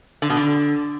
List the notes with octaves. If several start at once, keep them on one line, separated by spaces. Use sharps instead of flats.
D3
B2
D3